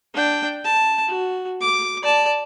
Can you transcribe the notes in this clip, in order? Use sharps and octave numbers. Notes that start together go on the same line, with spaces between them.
D4 G5
A5
F#4
D6
D5 A5